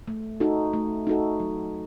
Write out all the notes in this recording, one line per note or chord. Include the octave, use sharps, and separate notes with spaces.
A3
D#4 F#4 A4
A3
D#4 F#4 A4
F#3